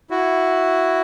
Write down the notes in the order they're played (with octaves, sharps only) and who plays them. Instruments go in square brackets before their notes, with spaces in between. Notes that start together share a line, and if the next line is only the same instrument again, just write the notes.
[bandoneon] E4 F#4